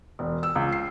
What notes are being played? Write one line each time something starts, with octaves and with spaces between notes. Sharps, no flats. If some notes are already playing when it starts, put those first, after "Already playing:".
E1
E6
C#2
C7